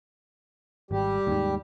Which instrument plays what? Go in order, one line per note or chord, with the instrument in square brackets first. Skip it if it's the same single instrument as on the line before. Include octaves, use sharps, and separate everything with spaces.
[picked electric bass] G#1 [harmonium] G3 G4
[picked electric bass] D#2 G#2